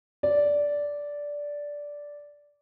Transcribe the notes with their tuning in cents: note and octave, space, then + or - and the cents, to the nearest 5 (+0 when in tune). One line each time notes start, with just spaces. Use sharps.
D5 -10